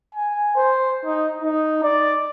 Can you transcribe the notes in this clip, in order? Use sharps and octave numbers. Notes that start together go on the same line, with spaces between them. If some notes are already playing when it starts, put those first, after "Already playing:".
G#5
C5
D#4
D#4
D5